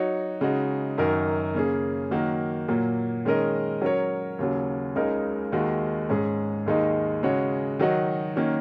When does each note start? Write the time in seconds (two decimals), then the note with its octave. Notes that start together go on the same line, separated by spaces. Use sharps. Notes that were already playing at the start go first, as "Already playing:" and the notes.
Already playing: F#3 D#4 F#4 C#5
0.41 C#3 G#3 D#4 F#4
0.98 F#2 D#3 F#3 D#4 A#4
1.54 C#3 A#3 C#4 G#4
2.11 D#3 F#3 A#3 F#4
2.68 A#2 F#3 A#3
3.25 D#3 G#3 C#4 A#4 D#5
3.82 F#3 C#4 A#4 C#5
4.39 D#2 C#3 F#3
4.95 C#2 C#3 G#3 D#4 A#4
5.52 D#2 D#3 G#3 F#4
6.10 G#2 G#3 C#4 G#4
6.66 D#2 D#3 G#3 D#4
7.23 C#3 G#3 F#4 C#5
7.79 D#3 F#3 D#4 F#4
8.37 D#3 F#3 A#3 C#4